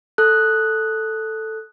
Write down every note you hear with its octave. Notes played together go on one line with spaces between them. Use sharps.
A4 F#6